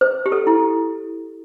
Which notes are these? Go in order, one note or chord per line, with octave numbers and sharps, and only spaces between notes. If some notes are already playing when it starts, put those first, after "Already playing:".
C5
G4
A4
E4